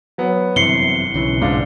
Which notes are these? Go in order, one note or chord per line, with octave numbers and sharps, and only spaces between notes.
F#3 B3
G1 F#2 C3 E3 C7 C#7 G7
B1 C#3 E3
G#2 D4 F4